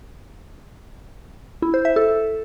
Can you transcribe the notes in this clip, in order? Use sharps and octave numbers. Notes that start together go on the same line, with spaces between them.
E4
C5
E5
A4